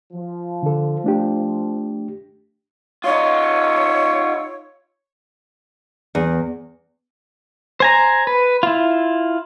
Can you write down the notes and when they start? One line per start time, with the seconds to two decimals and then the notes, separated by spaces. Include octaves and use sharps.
0.13 F3
0.63 D3 A4
1.04 A3 D4 G4
3.04 D#4 F4 C#5
6.15 E2
7.80 C5 G#5 A#5
8.27 B4
8.63 E4 F4